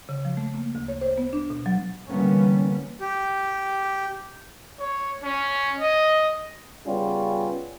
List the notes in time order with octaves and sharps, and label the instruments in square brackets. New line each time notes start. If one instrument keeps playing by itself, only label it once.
[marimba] C#3
F3
A3
A#3
D2
C#5
C5
B3
D4
B2
F#3
[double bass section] D3 E3 G3 A#3 B3 C#4
[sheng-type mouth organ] G4
[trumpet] C#5
C#4
D#5
[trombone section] C#3 G3 B3 C#4 F4